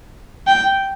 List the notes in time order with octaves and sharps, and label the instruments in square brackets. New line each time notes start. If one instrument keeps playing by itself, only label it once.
[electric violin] G5